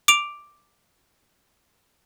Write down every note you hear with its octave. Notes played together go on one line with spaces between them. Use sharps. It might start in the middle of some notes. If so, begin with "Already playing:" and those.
D6 D7 F7